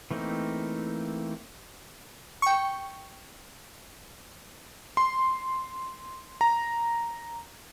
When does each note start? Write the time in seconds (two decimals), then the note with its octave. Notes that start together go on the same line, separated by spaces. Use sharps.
0.11 E3 A3 A#3 C4 D#4
2.42 G5 C#6
4.97 C6
6.41 A#5